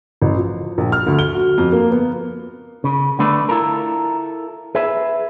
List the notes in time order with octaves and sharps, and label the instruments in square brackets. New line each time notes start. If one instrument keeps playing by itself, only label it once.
[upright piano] A1
F3
A#1
F6
D2
G7
F#4
F2
A#3
B3
[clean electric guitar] C#3
D3 A3 D4 B4
E4 F4 A4 A#4
G#4 B4 E5